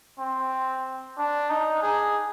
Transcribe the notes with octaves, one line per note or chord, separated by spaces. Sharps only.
C4
D4
D#4
G#4